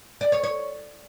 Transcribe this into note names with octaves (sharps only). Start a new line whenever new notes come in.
D5
C#5
C#5